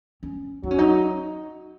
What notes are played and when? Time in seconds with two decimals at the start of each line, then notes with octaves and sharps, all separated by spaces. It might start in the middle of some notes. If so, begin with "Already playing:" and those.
0.23 C#4
0.63 F#3 D#4
0.71 C#4
0.78 D#4